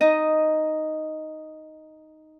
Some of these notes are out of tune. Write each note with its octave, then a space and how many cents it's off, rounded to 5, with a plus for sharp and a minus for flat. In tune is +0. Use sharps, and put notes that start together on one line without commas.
D#4 +0 D#5 +0